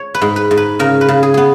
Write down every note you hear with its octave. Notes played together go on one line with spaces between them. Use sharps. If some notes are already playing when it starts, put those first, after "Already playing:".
Already playing: C#5
B4
G#2
B4
G#2
B4
C#3 A#4
B4
C#3
G#4
B3 G#4